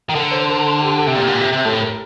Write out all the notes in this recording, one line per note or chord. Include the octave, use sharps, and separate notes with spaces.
D#3
D3 A#4
C5
A#4
G4
A4
C3
A#2 G4
D3
A#2
C3
C3
A2 A4
A#4